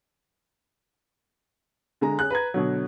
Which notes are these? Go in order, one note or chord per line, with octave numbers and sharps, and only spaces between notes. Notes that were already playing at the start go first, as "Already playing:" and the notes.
D3 G#3 A#5
C#4 G#4 F#6
B4 A#5 G#6
B2 D3 F#3